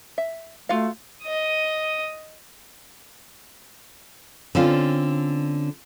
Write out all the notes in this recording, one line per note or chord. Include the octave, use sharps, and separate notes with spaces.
E5
A3 F4 F#4 F5
D#5 D#6
D3 C4 C#4 F4